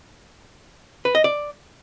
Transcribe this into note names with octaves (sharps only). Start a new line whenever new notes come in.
B4
D#5
D5